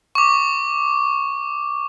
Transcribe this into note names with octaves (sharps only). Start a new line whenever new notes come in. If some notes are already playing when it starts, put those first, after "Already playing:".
C#6 D6